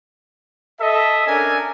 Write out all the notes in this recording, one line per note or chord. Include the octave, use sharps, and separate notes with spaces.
A4 D#5 E5
C#4 D4 A#4 G#5